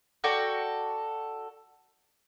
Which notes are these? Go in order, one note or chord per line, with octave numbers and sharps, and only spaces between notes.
F#4 A4 D5 G5